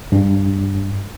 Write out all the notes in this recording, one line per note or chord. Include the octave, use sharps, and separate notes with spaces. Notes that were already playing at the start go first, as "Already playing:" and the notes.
G2